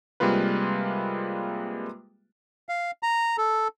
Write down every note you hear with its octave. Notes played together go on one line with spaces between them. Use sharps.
C3 G3 G#3 A#3 F4 B4
F5
A#5
A4